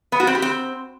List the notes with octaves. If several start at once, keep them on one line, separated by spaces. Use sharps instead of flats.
B3
F#4
C4
G4
C4